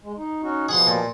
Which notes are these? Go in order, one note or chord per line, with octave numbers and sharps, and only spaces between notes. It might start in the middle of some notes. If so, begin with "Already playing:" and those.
G#3
D#4
C#4 D#4 F#4
B2 F3 G3 G#4 F#5 C6
A#2